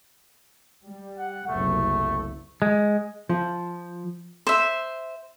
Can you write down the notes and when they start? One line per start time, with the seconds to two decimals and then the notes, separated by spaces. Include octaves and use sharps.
0.84 G3
1.18 F#5
1.48 F#1 C2 A3
2.62 G#3
3.29 F3
4.47 C5 E5